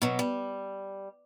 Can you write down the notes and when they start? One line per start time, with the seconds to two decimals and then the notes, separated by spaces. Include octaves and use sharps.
0.02 B2 F#3
0.19 G3